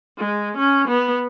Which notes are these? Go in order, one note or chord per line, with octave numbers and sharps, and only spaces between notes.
G#3
C#4
B3